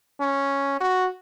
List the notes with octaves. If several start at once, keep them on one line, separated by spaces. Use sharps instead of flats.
C#4
F#4